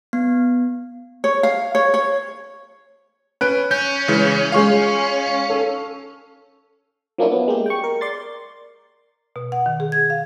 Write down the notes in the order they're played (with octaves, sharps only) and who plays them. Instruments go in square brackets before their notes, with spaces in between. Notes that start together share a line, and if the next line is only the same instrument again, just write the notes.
[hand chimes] B3
[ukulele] C#5
F5
C#5
C#5
[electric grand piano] C#4 B4 D7 [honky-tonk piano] F#6
[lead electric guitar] C#4 [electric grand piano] G6
[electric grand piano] C#3 E3 G#3
[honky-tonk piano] G#3 F4 [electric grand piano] F5 C#6
[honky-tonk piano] A4
[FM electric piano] F3 F#3 A#3 C#4 D4 E4
B3
G#3 A#3 G4
G5 C#6
A#4
D5 C6 A6
[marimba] B2
F#5
D#3
G#4
G#6
F5